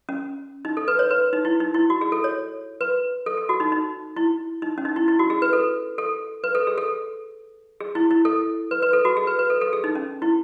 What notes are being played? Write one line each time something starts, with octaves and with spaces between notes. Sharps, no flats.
C#4
D#4
A4
B4
C#5
B4
D#4
E4
D#4
E4
F#4
G#4
A4
C#5
B4
A4
A4
F#4
D#4
D#4
E4
D#4
C#4
D#4
E4
E4
F#4
G#4
B4
A4
A4
B4
A4
G#4
A4
G#4
E4
E4
A4
B4
B4
A4
F#4
G#4
B4
B4
A4
A4
G#4
D#4
C#4
E4